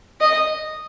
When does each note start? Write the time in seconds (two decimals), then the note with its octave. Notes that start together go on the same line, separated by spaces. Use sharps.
0.21 D#5